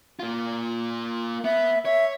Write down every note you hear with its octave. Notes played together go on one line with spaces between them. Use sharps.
A#3 F4
B3 E5
C#5 E5